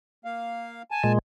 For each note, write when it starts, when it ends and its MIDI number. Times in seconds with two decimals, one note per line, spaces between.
0.25 0.82 58
0.25 0.82 77
0.91 1.12 80
0.91 1.12 81
1.04 1.19 46
1.04 1.19 56